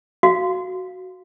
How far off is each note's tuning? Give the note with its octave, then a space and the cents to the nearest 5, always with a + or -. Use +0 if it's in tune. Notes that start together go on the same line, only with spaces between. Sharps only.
F#4 +0 F5 +0